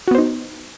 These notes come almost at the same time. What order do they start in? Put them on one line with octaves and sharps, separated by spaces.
F#4 B3 C5 D#4